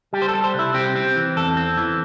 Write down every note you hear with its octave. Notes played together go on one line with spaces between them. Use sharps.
G3 G4
C5
A4
G3
C5
C2
E4
C4 G4
C4
E3
E2 A4
C4
E3